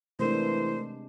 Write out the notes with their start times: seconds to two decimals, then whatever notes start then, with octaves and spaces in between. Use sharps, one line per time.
0.19 C3 E3 G#3 A3 D4 A#4 C5